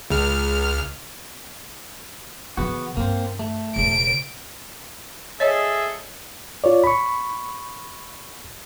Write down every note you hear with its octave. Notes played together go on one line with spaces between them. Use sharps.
C#2 F6
C#3 E3 B3 F#4
G2 A#3 C4
A3
E1 C#3 D7
G#4 A4 C#5 D#5 E5
F4 C#5 D5
B5 C#6